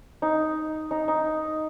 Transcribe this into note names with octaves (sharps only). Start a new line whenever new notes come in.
D#4
D#4
D#4